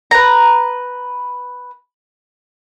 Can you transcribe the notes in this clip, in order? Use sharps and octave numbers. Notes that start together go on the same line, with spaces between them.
B4 A#5